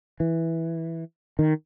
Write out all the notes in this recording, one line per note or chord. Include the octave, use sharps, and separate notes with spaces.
E3
D#3